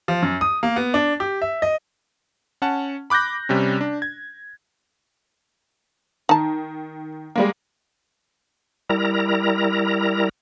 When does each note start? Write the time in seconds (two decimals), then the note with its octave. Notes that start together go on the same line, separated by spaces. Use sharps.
0.08 F3
0.22 F#2
0.41 D#6
0.63 A#3
0.76 B3
0.94 D4
1.20 G4
1.42 E5
1.62 D#5
2.62 C#4 F#5 A5
3.10 B5 D6 F#6 G6 A#6
3.49 C3 G3 C#4
3.81 D4
4.02 G#6
6.29 D#3 D#4 A5
7.36 G3 G#3 A#3
8.90 G3 E4 A#4 A#5